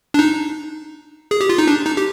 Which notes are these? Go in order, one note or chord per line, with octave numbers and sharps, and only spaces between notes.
D4
D#4
G#4
G4
F4
D#4
D4
D#4
G4